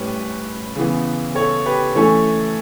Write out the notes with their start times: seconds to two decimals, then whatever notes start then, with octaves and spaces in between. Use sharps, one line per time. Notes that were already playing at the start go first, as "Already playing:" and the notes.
Already playing: A2 G3 C#4 B4
0.75 C#3 E3 B3
1.35 A4 C#5
1.66 G4 B4
1.95 E3 A3 C#4 A4 C#5